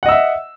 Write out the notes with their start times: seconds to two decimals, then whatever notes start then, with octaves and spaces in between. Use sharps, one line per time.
0.03 F#5
0.06 D#5
0.09 E6
0.12 E5